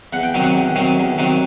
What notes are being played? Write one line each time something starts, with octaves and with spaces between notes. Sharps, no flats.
E2 F#5
G5
C3 D#3 F#3
F#5
E2
C3 D#3 F#3
E2
C3 D#3 F#3